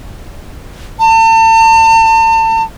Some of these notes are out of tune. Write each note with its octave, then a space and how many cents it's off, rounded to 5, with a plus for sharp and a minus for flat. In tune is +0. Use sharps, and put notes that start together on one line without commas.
A5 +40